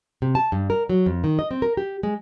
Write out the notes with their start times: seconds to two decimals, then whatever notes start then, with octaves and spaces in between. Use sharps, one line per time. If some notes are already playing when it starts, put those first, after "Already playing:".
0.22 C3
0.35 A5
0.52 G2
0.70 A#4
0.89 F#3
1.06 F2
1.24 D#3
1.39 D#5
1.51 C4
1.62 A#4
1.77 G4
2.03 G#3